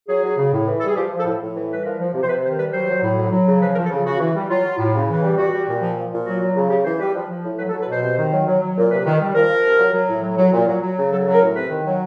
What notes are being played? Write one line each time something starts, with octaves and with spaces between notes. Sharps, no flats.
F#3 G#4
F#3
C#3
A2
E3
G3 A4
G#4
F3 G4
F3
A4
A2
A2
E3
G3 B4
F3 A#4
F3
C3
C5
C3 B4
D#3 C5
G3 B4
F#3 C5
F#3
A2
F#3
F#3
C#3
F3 B4
A#4
F3
A4
C#3 G#4
C#3 F#4
E3
G3
F#3 F4
F#3
A2
C#3
E3
G3
G3 F#4
G3
A#2
F3
F3
A#2
F#3 F#4
F#3
C#3
C#3 G4
E3 C5
G3 B4
F3
F3
A2
F#3 B4
A4
F#3
B4
B2 C5
C3
D#3
F#3
F#3
F#3
A#2
C3 B4
D#3
G3
F3 A#4
F3
C3
F#3
F#3
A2
F#3
F#3
A#2
F#3
F#3
C#3
F#3 A4
F#3
A#4
A2
C3 B4
D#3
F#3